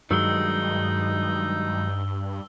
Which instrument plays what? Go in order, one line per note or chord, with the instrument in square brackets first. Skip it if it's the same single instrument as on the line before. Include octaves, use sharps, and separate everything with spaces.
[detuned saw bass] G2 [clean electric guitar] D#3 F#3 G#3 [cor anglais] D#4 [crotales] E6 G7